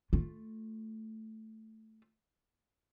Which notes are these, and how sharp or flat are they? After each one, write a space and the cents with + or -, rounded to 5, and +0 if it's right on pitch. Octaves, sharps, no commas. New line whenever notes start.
A3 +0 F4 +0